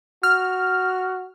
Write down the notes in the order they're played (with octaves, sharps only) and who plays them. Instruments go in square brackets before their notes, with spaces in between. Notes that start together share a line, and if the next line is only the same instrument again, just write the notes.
[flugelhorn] F#4 [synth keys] F6